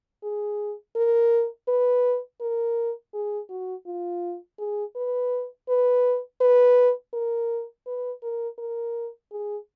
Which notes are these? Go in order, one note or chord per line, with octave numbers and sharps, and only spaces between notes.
G#4
A#4
B4
A#4
G#4
F#4
F4
G#4
B4
B4
B4
A#4
B4
A#4
A#4
G#4